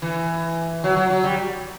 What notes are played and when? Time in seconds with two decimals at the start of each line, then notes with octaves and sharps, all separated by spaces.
0.02 E3
0.84 F#3
0.97 F#3
1.10 F#3
1.24 G3